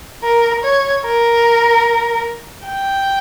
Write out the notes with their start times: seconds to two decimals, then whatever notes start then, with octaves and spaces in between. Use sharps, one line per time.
0.24 A#4
0.64 C#5
1.05 A#4
2.67 G5